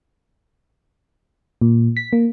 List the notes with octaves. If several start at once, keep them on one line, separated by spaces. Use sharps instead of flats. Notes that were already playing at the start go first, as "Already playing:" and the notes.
A#2
B6
A#3